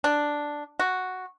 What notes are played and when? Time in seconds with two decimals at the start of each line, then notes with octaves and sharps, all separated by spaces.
0.04 D4
0.79 F#4